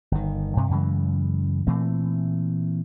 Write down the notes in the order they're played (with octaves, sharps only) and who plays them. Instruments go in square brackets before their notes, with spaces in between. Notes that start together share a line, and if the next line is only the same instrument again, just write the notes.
[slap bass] G1 D#3
G2 C3
F#2 C#3 E3 G#3
A#2 E3 A3 C4